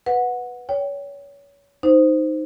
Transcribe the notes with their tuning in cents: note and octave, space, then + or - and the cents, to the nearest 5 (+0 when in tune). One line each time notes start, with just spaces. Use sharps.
B4 +0 F#5 -15
C#5 +30 G5 +0
D#4 +0 C5 -10